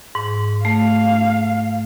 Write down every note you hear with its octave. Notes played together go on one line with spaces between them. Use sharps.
G#2
A3 F5